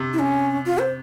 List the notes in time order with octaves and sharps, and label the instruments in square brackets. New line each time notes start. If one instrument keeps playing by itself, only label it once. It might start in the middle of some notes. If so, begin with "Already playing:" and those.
Already playing: [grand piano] C3
[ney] E4
C#4
F4
C5